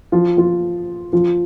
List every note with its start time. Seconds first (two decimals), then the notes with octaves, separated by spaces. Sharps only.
0.12 F3 F4
0.37 F3 F4
1.13 F3 F4